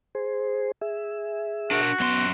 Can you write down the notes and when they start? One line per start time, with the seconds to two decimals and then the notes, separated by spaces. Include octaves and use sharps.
0.15 G#4 C5
0.81 G#4 E5
1.71 D4 F#4 A#4
2.00 F#2 B3 C6